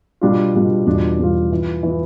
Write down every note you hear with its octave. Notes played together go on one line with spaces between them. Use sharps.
B2 G3 D4 F4
B2 G3 D4 F4
E2 B2 G3 D4 F4
E2 B2 G3 D4 F4
E3 B3 F4
E3 B3 F4